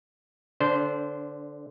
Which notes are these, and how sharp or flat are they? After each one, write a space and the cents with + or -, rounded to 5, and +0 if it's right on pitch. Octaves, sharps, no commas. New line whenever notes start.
D3 +0 D4 -30 C5 -10